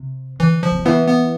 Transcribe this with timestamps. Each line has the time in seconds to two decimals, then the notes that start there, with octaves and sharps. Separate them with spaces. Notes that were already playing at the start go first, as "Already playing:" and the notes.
Already playing: C3
0.39 D3 E3
0.63 F3
0.71 C3
0.79 D3
0.85 E3 B3
1.08 B3